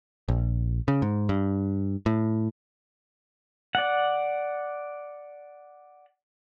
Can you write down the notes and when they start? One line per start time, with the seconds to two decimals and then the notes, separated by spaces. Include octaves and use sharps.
0.28 A#1
0.88 C#3
1.02 G#2
1.29 G2
2.06 A2
3.75 D5 F#5